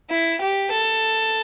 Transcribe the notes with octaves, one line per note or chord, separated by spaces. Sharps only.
E4
G4
A4